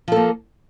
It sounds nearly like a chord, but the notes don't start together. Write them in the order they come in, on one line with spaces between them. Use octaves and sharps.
F3 A4 A#3